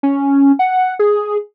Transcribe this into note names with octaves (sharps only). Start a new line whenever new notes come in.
C#4
F#5
G#4